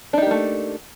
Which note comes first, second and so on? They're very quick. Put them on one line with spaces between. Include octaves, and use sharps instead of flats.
D4 D#4 G4 A#3 A3